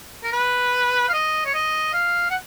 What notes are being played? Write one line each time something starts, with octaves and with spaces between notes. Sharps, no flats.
A#4
B4
F5
D#5
C#5
D#5
F5
F#5